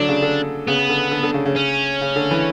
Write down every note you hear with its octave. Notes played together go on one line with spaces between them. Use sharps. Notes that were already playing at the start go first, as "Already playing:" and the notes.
Already playing: D3 F#3 D4
C#3
D3
C#3 B3
D3
D3
D3
C#3
C#3
C#4
C#3
D3
E3